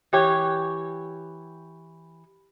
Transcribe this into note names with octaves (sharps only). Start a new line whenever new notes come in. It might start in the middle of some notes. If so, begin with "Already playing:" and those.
E3 G4 C#5